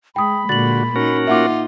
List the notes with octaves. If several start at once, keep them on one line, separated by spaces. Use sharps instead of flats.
G#3 G5 B5 D#6
A#2 D3 G#3 F#4 A6 F#7
C#4 D#4 F#4 A#4
A#3 D#4 F4 E5 F#5 D6